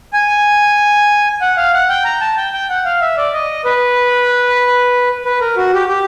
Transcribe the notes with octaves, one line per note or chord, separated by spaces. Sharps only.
G#5
F#5
F5
F#5
G5
A#5
A5
G5
G5
F#5
F5
E5
D5
D#5
B4
B4
A#4
F#4
G4
G4